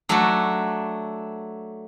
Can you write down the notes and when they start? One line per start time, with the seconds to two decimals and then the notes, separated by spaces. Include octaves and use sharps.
0.09 F#3 A3 D4 F#4